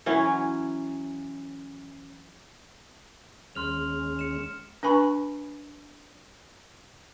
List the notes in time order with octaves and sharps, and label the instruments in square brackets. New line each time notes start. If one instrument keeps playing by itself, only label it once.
[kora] E3 F#3 C#4
[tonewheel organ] D#2 G#3 C#4 [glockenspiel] C6 F6 F7
[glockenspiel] C#7 E7
[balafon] D4 B4 G#5 B5 C#6